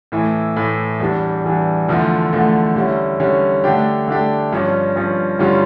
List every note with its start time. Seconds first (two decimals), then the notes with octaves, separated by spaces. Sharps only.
0.12 A2 E3 A3 E4
0.56 A2 E3 A3 E4
1.00 E2 E3 G3 D4
1.44 E2 E3 G3 D4
1.88 E2 D3 F3 A3 E4
2.33 E2 D3 F3 A3 E4
2.76 D3 G3 C#4 E4
3.20 D3 G3 C#4 E4
3.64 D3 A3 D4 G4
4.08 D3 A3 D4 G4
4.53 G2 F3 C#4
4.96 G2 F3 C#4
5.39 G2 D3 G3 C#4 F4